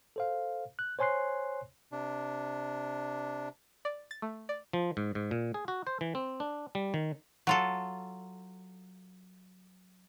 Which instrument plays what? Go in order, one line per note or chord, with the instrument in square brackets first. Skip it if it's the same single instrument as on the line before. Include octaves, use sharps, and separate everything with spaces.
[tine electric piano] A4 C5 F5
F#6
C5 C#5 G#5 C6 F#6 C7
[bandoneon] C3 D4
[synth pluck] D5
A6
A3
D5
[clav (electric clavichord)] F3
G#2
G#2
A#2
G#4
F#4
C5
E3
C4
D4
G3
D#3
[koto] F#3 F4 A4